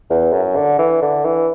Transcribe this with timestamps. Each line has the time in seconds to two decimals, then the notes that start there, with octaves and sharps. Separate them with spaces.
0.10 E2
0.32 F#2
0.56 D3
0.79 E3
1.02 D3
1.25 E3